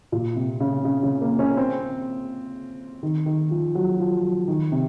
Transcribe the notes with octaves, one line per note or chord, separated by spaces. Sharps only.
A#2
C3
C#3
C#3
C#3
A#3
C#4
C4
D#3
D#3
F3
F#3
F3
F#3
D#3
C3